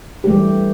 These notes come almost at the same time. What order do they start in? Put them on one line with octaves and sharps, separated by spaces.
G4 A3 E3 G3